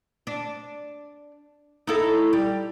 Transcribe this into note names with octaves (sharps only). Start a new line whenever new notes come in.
D4
D#4 E4 A4
G3